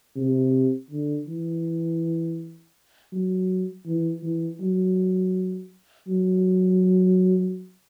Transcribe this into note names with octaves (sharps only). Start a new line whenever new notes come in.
C3
D3
E3
F#3
E3
E3
F#3
F#3